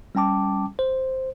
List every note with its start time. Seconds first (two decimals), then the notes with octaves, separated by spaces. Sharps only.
0.15 G3 C#4 G5 A5 D6
0.79 C5